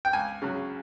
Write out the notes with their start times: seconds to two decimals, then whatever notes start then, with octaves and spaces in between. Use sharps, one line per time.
0.05 G5
0.13 C#2 G#5
0.42 C#3 F#3